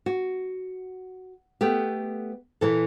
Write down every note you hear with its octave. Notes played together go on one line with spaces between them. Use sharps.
F#4
A3 B3 G4
A#2 E3 A4